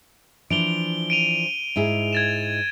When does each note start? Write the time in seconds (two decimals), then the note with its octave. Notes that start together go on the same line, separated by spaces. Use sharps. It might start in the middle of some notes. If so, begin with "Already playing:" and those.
0.50 E3 F3 D4 D7 F7 G7
1.10 D7 D#7 F7
1.76 G#2 E4 G#4
2.13 G#6 A6 E7